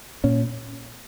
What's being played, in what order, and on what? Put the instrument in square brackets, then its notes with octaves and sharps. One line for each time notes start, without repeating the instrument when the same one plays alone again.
[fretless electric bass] A#2 C#4